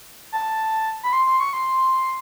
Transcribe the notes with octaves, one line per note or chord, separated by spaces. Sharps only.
A5
B5
C6
C6
C#6
C6